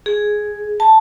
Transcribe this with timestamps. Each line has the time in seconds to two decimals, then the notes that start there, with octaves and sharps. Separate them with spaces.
0.06 G#4
0.80 A5